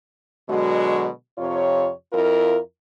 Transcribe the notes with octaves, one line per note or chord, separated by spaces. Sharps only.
B2 D3 F#3 G#3 F#4
F2 C3 F4 C#5
F2 E4 F4 A#4